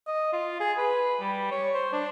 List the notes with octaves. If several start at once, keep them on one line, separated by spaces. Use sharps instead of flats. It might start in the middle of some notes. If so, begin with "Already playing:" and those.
D#5
F4
G#4
B4
G3
C#5
C5
D4